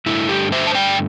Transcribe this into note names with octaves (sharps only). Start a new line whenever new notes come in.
G2 D3 A3 E4
G4
C5 E5
A5
D5 G5